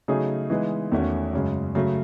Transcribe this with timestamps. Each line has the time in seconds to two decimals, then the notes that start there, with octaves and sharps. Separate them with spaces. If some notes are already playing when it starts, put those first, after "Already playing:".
0.08 C#3 F#3 A3 D#4 G#4
0.50 E3 G#3 B3 D#4
0.92 E2 D#3 A3 C#4 F#4
1.33 F#2 C#3 G#3
1.75 C#3 F#3 A3